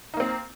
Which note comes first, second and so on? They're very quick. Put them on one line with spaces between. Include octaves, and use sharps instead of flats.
D#4 A#3 C4